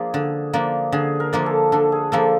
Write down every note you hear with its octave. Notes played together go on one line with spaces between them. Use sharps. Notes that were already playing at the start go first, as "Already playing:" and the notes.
Already playing: F3 A#3 D4 G#4
D3
F3 A#3 D4
D3 G#4
A#4
F3 A#3 D4
A4
D3 A4
G#4
F3 A#3 D4 A4